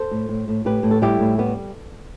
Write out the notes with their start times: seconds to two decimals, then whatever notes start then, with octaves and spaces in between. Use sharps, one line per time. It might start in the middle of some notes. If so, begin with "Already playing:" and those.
Already playing: A4 C5
0.11 A2
0.29 A2
0.48 A2
0.65 A2 G4 B4
0.83 A2
0.91 A4
1.02 G3 E4 G4
1.19 A2
1.38 G3 B3